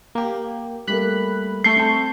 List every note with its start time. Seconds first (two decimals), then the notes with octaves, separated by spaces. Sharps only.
0.15 A#3 G4
0.87 G3 A3 A#3 B5 F#6
1.64 A3 C#6 G6 C7
1.76 C4 A5